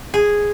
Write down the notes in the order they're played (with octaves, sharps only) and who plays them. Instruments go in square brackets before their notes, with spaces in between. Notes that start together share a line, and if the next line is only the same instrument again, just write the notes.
[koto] G#4